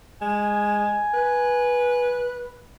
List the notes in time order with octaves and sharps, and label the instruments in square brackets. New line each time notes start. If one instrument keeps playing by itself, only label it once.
[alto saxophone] G#3 [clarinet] G#5
[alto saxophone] B4